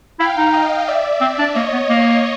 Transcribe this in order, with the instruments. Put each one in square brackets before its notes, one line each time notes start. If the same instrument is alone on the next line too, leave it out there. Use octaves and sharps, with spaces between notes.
[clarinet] E4 [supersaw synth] F5 G5
[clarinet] D#4
[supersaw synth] D#5 F5
D5 E5
[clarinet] C4
D4
[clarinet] A#3 [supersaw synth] C#5 D#5
[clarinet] B3
A#3